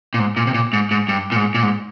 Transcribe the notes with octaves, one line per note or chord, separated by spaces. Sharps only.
A#2
G#2
A#2
C3
A#2
G#2
G#2
G2
A#2
G#2
A#2
G#2